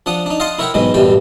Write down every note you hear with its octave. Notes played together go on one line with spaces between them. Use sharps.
F3 D4 F#5 D#6
D4 D#4
D#5 F5 F#5 A5 C6 D#6
E4 A#4 C#5 E5 F#5 G5
E2 G#2 B2 F#3 G#3 B3
A1 F#2 B2 E3 G3 G5